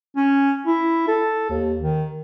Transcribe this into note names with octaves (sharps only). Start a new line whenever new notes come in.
C#4
E4
A4
D#2
D#3